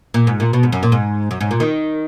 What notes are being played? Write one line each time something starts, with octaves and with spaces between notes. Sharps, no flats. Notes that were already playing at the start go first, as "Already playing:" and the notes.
A#2
G#2
A#2
B2
G#2
F#2
A#2
G#2
F#2
G#2
A#2
D#3